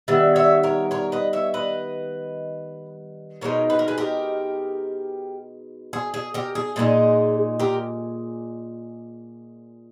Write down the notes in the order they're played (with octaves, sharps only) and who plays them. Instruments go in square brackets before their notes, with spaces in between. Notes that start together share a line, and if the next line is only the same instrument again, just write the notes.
[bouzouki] D#3 G3 B3 E5
C#5 E5
A#4 C#5
A#4 C#5
B4 D#5
C#5 E5
B4 D#5
B2 G#3 D#4 A#4 C#5
B4
A#4
G#4 B4
G4 A#4
G#4
G#4
G4 A#4
G#4
A#2 G#3 B3 D#4 G#4
G4 A#4